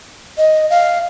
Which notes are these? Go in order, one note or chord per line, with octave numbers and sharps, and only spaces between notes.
D#5
F5